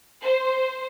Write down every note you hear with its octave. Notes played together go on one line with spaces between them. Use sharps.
C5